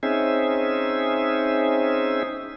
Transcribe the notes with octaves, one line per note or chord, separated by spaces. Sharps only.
C4 C#4 D#4 G#4 E5